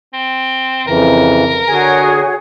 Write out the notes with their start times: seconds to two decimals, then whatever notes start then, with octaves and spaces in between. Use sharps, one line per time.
0.13 C4
0.87 F2 C#3 E3 A#4
1.68 D3 F#4 G#4 C#5 G#5